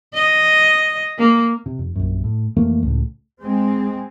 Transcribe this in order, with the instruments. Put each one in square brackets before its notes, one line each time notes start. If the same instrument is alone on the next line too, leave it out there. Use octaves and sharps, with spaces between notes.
[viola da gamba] D#5
A#3
[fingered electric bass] C3
F1
A#1 F#2
A2
F1 E3 A3 A#3
C#2 A2
[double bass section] G#3 C4